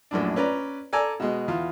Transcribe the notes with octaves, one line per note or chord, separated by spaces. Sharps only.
A#1 F#2 A2 D4
C#4 B4 D5 A#5
A4 D5 G#5 A#5
B2 G#3
E2 F4